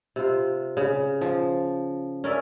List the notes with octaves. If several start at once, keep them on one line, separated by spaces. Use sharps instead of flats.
C3 F4
C#3
F3
C#4 A#4 D5 E5